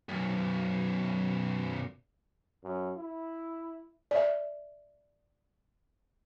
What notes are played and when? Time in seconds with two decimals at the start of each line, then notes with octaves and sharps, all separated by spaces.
0.09 B1 F#2
2.64 F#2
2.97 E4
4.11 D5 E5